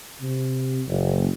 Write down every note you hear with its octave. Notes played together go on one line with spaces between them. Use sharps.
C3
F#1